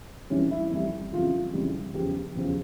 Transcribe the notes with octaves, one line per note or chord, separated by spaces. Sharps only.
F2 E3 G3 C#4
E4
F2 E3 G3
F2 C#3 E3 G3 F4
F2 C#3 E3 G3
E2 C#3 F3 G4
E2 C#3 F3